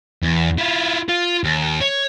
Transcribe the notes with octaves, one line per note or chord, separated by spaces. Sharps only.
E2
E4 F4
F4
D#2
C#5